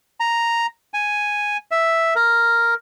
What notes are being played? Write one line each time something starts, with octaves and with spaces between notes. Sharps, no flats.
A#5
G#5
E5
A#4